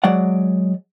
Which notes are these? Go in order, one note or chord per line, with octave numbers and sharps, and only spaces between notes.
F#3 G#3 D5 F#5